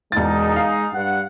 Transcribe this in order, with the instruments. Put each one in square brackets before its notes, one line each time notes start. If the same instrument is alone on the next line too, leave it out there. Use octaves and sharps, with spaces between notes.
[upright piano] E1 A6 [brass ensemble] G#3 D#4
[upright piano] F5
[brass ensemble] G2 F#5